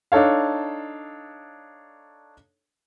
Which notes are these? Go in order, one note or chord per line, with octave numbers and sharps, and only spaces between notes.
D4 D#4 A4 C#5 F5